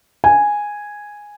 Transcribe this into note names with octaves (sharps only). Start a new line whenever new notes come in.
G#5